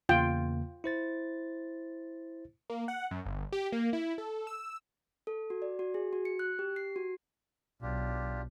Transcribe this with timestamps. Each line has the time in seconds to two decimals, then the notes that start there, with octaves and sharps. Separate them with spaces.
0.09 E2 C#3 A#3 F4 G5
0.84 E4 C5 A6
2.70 A#3
2.88 F#5
3.11 F#2
3.25 G1
3.52 G4
3.72 A#3
3.93 E4
4.18 A4
4.47 E6
5.27 A4
5.50 F#4
5.62 D5
5.79 F#4
5.94 G#4
6.13 F#4
6.25 C#7
6.39 F#6
6.59 G4
6.76 C7
6.96 F#4
7.82 B1 D4 F4 G4